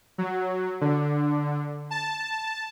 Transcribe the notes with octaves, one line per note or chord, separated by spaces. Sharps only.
F#3
D3
A5